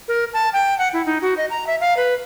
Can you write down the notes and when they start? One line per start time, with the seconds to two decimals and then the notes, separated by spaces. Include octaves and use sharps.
0.08 A#4
0.34 A5
0.53 G5
0.79 F#5
0.93 E4
1.06 D#4
1.22 F#4
1.37 D#5
1.50 A#5
1.67 E5
1.81 F5
1.97 B4